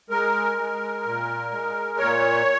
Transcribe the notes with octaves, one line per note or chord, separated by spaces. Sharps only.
G#3 A#4
G#3
A#2
G#3
A#2 C#5